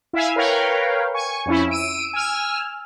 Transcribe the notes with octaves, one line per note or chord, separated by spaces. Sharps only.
E4 E5 F5 G#5
A#4 B4 C#5 F5 G5
G#5 C#6
F2 C#4 E4
E6 D7 D#7
G#5 E6 F6